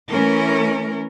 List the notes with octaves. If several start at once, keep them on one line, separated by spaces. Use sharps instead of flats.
E3 A3 C#4 A#4